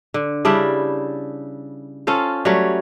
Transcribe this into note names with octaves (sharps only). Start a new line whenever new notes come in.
D3
C#3 G3 D4 E4
C#4 F4 A4 C5
F#3 G3 A3 C#5